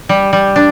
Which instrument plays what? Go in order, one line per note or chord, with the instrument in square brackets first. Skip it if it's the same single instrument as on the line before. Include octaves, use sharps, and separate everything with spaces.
[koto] G3
G3
D4